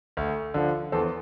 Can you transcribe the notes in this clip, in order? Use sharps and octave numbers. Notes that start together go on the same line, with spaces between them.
D2
D3 F3
E2 A4 C5